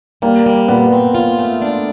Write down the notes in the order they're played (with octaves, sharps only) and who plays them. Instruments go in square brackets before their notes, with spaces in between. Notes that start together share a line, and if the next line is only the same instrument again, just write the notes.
[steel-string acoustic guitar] G3 [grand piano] A#3
[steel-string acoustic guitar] G3
[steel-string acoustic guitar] A#2 [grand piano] B3
[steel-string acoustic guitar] C4
F4
A3
D4